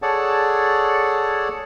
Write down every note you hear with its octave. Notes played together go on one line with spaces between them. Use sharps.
G#4 A4 C#5 D5 F#5 A5